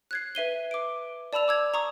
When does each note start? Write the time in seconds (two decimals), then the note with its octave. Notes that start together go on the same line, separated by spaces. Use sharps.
0.11 F#6 G#6 C7
0.35 B4 E5 D#7 G7
0.71 D6 D7
1.33 D5 A5 B5 E6 F7
1.48 D6 E6 G#6
1.74 A#5 C#6 D#6